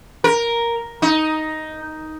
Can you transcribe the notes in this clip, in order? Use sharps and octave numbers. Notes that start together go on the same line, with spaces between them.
A#4
D#4